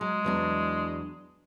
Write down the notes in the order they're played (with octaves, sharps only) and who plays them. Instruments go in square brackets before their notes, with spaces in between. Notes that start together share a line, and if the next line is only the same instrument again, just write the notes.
[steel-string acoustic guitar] F#3 [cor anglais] G#3
[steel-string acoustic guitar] E2 F#3 D4